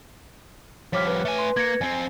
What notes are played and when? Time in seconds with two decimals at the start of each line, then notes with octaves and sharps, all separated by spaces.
0.93 F3 G3 C#5 D6 F6 B6
1.07 B4
1.25 A3 G#5
1.39 C6
1.57 A#3 G#6 A#6 C#7
1.81 F2 C4 G#5